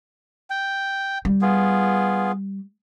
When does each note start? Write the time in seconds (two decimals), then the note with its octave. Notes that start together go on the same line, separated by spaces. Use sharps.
0.50 G5
1.25 G3
1.42 B3 F4 G#4